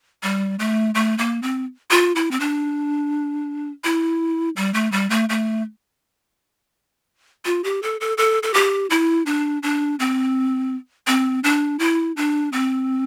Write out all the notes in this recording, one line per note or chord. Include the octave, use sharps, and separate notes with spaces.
G3
A3
A3
A#3
C4
F4
E4
C4
D4
E4
G3
A3
G3
A3
A3
F4
G4
A4
A4
A4
A4
G4
E4
D4
D4
C4
C4
D4
E4
D4
C4